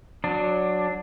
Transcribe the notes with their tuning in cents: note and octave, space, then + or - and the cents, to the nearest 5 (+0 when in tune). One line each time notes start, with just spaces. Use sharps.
F#3 -10 D4 +10